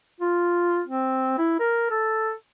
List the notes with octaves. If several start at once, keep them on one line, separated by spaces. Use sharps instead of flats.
F4
C4
E4
A#4
A4